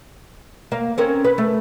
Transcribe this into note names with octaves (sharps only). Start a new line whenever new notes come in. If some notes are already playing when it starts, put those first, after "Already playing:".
A#3 F5
C4 C#4 A#4
B4
A3